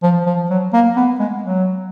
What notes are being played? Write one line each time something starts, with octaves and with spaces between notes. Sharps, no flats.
F3
F3
F#3
A#3
B3
G#3
F#3